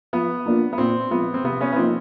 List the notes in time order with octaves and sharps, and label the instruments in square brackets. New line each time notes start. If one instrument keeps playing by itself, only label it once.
[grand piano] F3 [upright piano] B3
[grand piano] A#3 D4 F4
[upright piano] B3
[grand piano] A#2 [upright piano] C4
[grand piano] F3 G#3 [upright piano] B3
[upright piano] C4
[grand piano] C3 [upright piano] B3
[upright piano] B3 C#4
B3
[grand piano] F3 A#3 D#4 [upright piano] C4